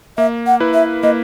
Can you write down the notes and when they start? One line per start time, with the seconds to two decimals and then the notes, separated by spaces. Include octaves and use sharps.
0.18 A#3 E5
0.47 F#5
0.60 E4 B4
0.74 E5
1.03 A#3 D#5